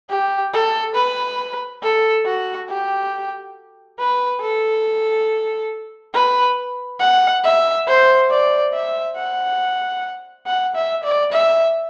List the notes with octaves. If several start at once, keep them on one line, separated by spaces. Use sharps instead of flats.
G4
A4
B4
A4
F#4
G4
B4
A4
B4
F#5
E5
C5
D5
E5
F#5
F#5
E5
D5
E5